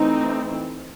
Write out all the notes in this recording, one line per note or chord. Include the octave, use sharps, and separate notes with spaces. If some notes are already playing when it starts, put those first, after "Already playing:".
Already playing: E3 A3 C4 D#4